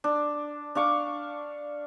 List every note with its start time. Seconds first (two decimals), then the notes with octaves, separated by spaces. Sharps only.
0.04 D4
0.75 D4 F5 C#6 D6